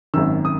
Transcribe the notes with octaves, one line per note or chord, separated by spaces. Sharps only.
G#1 F#2 D#3 E6
D#6